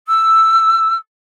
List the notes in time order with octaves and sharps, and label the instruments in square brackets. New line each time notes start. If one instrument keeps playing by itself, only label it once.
[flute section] E6